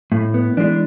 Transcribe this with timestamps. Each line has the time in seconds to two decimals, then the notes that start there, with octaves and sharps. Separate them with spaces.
0.12 A2
0.34 B3
0.57 E3 G#3 D4